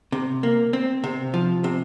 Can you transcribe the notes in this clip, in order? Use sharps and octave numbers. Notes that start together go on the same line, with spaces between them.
C3
A#3
C4
C3
F3
C3